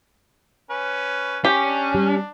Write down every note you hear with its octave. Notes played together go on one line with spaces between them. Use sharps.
C#4 B4
C#4 G4
D4
G3